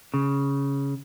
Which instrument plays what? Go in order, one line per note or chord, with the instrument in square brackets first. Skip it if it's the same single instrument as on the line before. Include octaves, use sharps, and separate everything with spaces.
[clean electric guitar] C#3